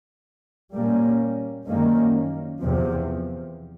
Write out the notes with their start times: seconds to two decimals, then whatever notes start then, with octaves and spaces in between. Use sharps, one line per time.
0.74 A#2 G3 A#3 C#4
1.67 F#2 D#3 G3 A#3 C#4
2.60 E2 C3 F3